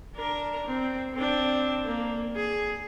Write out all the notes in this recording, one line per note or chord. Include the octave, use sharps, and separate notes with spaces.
D4 A#4
C4
C4 D4
A#3
G#4